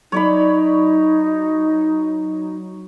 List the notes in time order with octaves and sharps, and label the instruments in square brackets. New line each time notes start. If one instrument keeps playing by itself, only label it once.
[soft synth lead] F#3 [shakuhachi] D#4 [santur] C#5 D5 B5